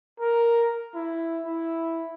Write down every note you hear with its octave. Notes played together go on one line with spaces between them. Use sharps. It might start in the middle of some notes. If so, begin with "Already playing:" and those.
A#4
E4
E4